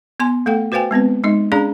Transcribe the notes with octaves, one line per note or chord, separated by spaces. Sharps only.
B3 G#5 C6
A3 A4 F5 G5
F#4 B4 C5 F5 G5 G#5
G#3 B3 C4 B4
G#3 D#4 D#5
C#4 D4 G#4 D5 F5 A#5